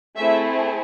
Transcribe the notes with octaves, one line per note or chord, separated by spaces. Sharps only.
A3 C4 E4 G#4 E5